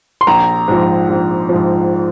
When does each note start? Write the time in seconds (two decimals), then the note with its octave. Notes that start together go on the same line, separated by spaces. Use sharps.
0.21 C6
0.27 A#1 A#5
0.68 G#2 F3
1.09 A#1
1.49 G#2 F3